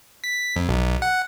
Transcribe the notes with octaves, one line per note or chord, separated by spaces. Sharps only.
B6
F2
B1
F#5